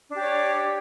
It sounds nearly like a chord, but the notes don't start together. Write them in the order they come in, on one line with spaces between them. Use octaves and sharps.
D4 D5 G4 C#5